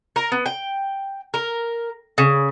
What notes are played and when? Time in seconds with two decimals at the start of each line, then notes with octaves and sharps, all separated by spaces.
0.16 A#4
0.32 B3
0.46 G5
1.34 A#4
2.18 C#3